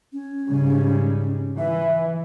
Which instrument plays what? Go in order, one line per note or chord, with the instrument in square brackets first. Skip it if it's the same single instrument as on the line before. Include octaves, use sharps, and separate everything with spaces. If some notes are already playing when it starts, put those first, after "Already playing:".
[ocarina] C#4
[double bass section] G#2 C#3 G3
[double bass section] E3 [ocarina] E5